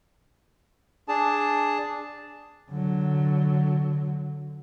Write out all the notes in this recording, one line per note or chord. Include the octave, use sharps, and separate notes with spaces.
D4 G#4 A5
D3 F#3